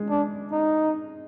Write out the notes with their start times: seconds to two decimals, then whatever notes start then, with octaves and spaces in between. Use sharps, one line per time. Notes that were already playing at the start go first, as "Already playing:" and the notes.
Already playing: G#3
0.10 D4
0.52 D#4